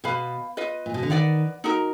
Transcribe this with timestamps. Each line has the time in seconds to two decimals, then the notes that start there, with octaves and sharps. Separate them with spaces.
0.04 B2 B4 F5 B5
0.57 F4 B4 D#5
0.86 A#2
0.94 B2
1.03 D3
1.10 D#3 B4 D5 F#5
1.64 D#4 F#4 A#4